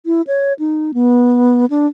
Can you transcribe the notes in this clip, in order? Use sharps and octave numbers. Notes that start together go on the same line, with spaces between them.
E4
C#5
D#4
B3
D4